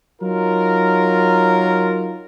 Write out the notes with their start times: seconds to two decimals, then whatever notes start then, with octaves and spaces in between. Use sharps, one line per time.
0.22 F#3 D#4 F4 A#4